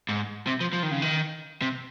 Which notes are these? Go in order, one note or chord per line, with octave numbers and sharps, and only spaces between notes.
G#2
C3
F3
F3
D#3
C#3
D#3
C3